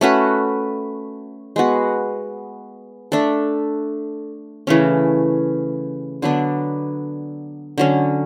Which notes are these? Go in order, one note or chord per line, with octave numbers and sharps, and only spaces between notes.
A3 C#4 F#4 B4
G#3 B3 F#4
A3 D4 A4
C#3 E3 A3 C#4
D3 F#3 B3 D4
D3 F#3 C#4